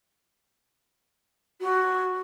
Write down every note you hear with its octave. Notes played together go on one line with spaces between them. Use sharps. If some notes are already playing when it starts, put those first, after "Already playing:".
F#4